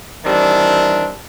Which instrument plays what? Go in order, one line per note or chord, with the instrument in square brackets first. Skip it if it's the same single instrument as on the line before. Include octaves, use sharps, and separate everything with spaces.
[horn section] D#3 E3 G3 C4 D4